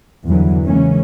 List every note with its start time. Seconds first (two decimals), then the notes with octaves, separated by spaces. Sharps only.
0.25 E2 G2 D3 E3 F#3
0.64 C#3 E3 G#3 A#3 C#4